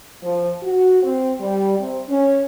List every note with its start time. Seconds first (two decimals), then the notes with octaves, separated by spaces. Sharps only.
0.23 F3
0.63 F#4
1.03 C4
1.40 G3
1.79 C3
2.09 C#4